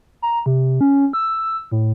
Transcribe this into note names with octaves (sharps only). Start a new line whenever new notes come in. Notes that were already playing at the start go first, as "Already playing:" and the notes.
A#5
C3
C#4
E6
A2